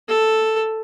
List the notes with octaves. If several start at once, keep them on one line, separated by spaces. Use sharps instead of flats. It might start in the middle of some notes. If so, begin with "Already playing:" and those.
A4